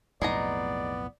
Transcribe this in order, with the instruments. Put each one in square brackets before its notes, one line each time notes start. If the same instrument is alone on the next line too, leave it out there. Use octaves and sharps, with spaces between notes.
[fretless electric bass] B1 F2 A2 [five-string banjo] G#3 D#4 A#5 [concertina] B3 [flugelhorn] D5